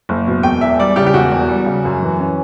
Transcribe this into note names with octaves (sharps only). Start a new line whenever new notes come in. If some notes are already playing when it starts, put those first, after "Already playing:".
F#1
B2
E1 G5
E2 E5
G3 D5
C#3 G4
G4
E1 F#4
E2
G3
C#3
F#2
E3
C#4